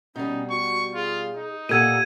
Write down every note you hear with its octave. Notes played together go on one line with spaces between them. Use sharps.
B2 G3 C#4 D#4
F#4 C#6
F4 G#4
D#4
A#2 G4 A4 F#5 G#6 D#7